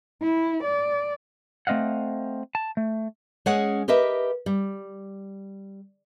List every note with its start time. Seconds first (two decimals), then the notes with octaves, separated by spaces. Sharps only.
0.22 E4
0.64 D5
1.67 A3 C4 D#5 F5 F#5
2.55 A5
2.77 A3
3.46 G#3 C#4 G#4 C#5 F#5
3.88 G4 A#4 B4 D#5 E5
4.46 G3